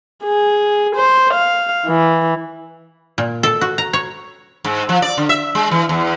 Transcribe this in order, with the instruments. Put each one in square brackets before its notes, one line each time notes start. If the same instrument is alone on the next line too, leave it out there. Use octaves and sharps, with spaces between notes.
[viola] G#4
C5
F5
E3
[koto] A#2
A4
F#4
A#5
C#5
[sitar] G#2
F3
D5
D3
E5
G#3
E3
E2